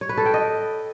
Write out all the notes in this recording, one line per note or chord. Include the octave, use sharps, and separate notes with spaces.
C#5
B4
A4
G5
D#5